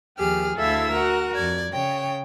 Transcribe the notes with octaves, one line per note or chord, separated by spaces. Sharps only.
D#2 F3 G4 G#4 F6
D2 E4 A4 E5 F5 E6
F#4 A#4 F#5
F2 D5 G#6
C#3 C#5 G5